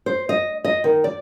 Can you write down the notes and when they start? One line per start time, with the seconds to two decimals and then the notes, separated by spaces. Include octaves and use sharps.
0.06 C5
0.29 D#5
0.64 D#5
0.84 D#3
1.04 D5